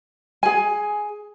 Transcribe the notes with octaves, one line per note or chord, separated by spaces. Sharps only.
G#4 G#5